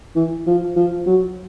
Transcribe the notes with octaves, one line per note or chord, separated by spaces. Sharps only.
E3
F3
F3
F#3